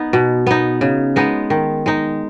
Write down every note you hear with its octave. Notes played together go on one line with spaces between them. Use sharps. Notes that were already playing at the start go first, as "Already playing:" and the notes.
Already playing: B3 D#4
B2
B3 D#4
C#3
G#3 B3 D#4
D#3
G#3 D#4